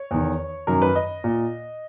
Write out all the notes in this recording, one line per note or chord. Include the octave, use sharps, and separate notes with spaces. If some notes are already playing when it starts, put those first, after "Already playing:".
Already playing: C#5
E2 D#3
F#2 D#3 A#4
B4
D#5
A#2